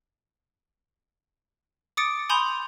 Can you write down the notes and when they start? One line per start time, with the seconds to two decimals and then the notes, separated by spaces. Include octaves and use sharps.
1.97 D6 D#6 A6 C#7 D7
2.29 G#5 B5 C6 D#6 G6 F7